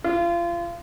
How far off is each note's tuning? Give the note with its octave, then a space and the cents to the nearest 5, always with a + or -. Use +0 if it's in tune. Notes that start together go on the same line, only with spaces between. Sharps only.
F4 -30